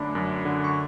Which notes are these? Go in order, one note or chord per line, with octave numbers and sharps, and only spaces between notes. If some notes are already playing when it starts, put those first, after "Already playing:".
Already playing: F#2 D3 A3 D4 B5 D6
F#2
D3
C#6